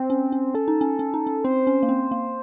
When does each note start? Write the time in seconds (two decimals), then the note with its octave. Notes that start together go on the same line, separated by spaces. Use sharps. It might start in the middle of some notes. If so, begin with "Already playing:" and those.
Already playing: C4
0.10 C#4
0.32 C#4
0.55 C#4 A4
0.68 D#4
0.81 C#4
0.99 C#4
1.14 D#4
1.27 C#4
1.44 C4 C5
1.67 C#4
1.83 A#3
1.89 C4
2.11 A#3